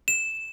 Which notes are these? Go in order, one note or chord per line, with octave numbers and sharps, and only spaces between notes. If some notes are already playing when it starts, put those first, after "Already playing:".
E7